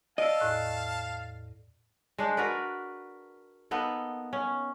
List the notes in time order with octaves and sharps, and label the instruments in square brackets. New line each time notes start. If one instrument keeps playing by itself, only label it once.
[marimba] D5 E6 [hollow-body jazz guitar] D#5 [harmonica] F5 A5
[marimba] E2 A2 F#6
[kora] G#3 D4 C5
F#4 A#4 B4 D5
A#3 B3 D#4 A4
C#4